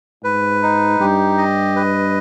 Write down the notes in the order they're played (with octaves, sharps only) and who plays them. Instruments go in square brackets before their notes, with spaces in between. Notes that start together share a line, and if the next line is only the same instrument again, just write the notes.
[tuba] G#2 [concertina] B4
[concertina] D#4
[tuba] G2 [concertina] G4
[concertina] D#5
B4